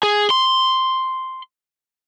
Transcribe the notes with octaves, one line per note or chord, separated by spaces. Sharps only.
G#4
C6